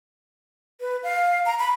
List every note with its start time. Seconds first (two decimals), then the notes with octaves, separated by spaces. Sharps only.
0.80 B4
1.03 F5
1.46 A#5
1.59 B5